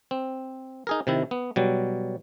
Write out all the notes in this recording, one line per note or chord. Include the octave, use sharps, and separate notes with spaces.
C4
D#4 G#4 A#4
C3 D#3 E4
B3
B2 F#3 G3